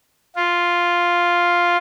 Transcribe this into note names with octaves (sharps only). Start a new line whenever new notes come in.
F4